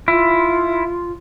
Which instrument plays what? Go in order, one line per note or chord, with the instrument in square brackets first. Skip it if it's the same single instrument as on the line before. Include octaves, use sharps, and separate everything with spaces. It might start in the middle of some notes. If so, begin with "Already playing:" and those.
[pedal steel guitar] E4 [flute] F4